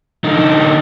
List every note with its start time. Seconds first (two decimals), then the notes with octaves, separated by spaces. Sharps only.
0.24 D3 D#4